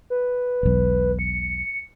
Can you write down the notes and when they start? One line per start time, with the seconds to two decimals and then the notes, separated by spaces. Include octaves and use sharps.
0.10 B4
0.63 E1 B1
1.19 C#7